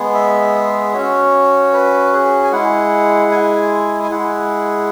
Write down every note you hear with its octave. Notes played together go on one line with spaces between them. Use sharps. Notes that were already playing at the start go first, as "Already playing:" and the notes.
Already playing: G#3 B3 G#4
E5
C#4 F#4 C#5
B4
G#4
G#5
G#3 E4 G#4 F#5
G#5
G#5
G#3 E4 G#4 F#5